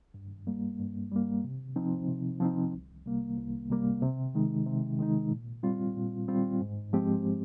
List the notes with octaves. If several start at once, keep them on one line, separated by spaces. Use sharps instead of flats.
G2
G3 A#3
G2
G3 A#3
C3
F3 C4 D#4
C3
F3 C4 D#4
C2
C3 G3 A#3
C2
C3 G3 A#3
C3
D#3 G#3 D#4
C3
D#3 G#3 D#4
A#2
G3 C4 F4
A#2
G3 C4 F4
G#2
F3 G#3 C4 G4